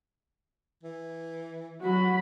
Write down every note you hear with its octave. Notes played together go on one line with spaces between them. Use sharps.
E3
F#3 F#4 B5